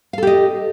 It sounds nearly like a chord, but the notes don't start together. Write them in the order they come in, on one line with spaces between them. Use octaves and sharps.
F5 A4 G4 D#5